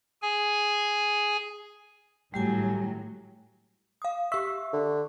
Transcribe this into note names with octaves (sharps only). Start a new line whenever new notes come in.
G#4 G#5
G#1 A2 F#3 G3 G4 G#5
F5 D#6
G4 E5 C#6
D3